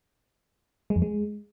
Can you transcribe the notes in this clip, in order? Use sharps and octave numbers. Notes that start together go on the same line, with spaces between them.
G#3
F2
G#3